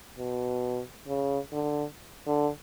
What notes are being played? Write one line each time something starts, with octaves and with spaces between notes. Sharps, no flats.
B2
C#3
D3
D3